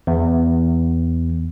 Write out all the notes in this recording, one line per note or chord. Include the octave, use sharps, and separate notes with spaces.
E2